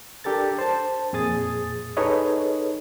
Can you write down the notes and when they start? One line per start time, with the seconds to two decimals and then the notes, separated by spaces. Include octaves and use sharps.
0.24 D4 G4 A4 A#4 A6
0.59 C5 A5
1.13 F2 A#2 G#4 D#6 A6
1.97 D#4 G#4 A4 B4 C#5 D#5